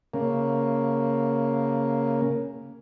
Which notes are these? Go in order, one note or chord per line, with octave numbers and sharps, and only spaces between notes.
C#3 A#3